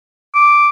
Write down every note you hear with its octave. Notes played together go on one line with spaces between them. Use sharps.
D6